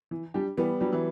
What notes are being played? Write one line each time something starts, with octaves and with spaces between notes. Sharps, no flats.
E3
G3 D4 G4
E3 G3 B3
F#3 G3 D4 G4
E3